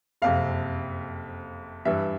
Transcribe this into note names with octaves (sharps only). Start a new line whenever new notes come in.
F#1 F2 C3 F5
G2 E3 G3 E5